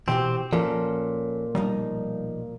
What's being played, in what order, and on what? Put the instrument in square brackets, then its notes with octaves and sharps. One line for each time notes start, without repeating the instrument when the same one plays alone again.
[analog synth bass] B2 [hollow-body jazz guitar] E3 F#4 G4 [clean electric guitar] C4
[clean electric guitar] A#2 [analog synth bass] F3 [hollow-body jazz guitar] C#4 F#4 A4
[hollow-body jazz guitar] B1 F3 D#4 [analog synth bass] G3